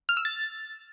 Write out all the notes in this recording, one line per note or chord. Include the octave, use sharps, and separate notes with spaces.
F6
E6
A6